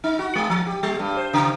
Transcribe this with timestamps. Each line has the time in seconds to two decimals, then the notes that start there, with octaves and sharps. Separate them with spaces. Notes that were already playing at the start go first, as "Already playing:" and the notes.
0.04 D#4
0.19 F#4
0.35 G#3
0.50 F3
0.66 G4
0.83 G3
0.99 G2
1.17 C5
1.33 C#3